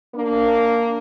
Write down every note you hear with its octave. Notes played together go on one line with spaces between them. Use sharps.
A#3 D4